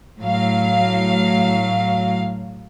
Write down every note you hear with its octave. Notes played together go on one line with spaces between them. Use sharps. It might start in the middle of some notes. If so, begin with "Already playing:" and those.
A2 F#3 F5